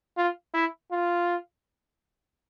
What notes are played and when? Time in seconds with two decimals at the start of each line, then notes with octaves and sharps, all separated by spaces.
0.17 F4
0.54 E4
0.91 F4